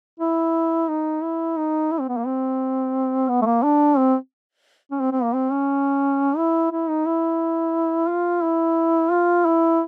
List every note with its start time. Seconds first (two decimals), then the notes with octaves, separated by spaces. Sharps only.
0.20 E4
0.89 D#4
1.23 E4
1.57 D#4
1.91 E4
2.00 C4
2.08 B3
2.17 A#3
2.26 C4
3.29 B3
3.42 A3
3.46 A#3
3.63 D4
3.97 C4
4.91 C#4
5.00 C4
5.12 C4
5.23 A#3
5.34 C4
5.51 C#4
6.37 E4
6.71 E4
6.89 D#4
7.06 E4
8.09 F4
8.43 E4
9.12 F4
9.46 E4